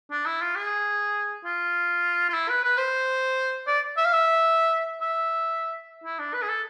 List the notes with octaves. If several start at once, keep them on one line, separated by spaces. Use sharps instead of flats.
D4
E4
F4
G#4
F4
F4
E4
B4
B4
C5
D5
E5
F5
E5
E5
E4
D4
B4
G#4
A4